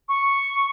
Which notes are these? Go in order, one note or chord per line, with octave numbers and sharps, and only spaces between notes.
C#6